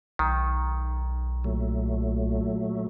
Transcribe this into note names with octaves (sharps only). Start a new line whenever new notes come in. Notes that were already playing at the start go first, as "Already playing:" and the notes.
B1 D#3
A#2 F#3 A3